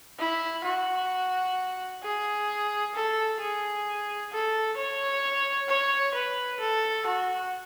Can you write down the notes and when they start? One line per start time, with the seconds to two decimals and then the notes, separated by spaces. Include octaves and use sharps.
0.19 E4
0.65 F#4
2.03 G#4
2.94 A4
3.41 G#4
4.32 A4
4.77 C#5
5.69 C#5
6.14 B4
6.60 A4
7.06 F#4